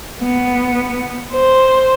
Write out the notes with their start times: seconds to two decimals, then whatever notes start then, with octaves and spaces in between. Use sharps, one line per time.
0.22 B3
1.33 C5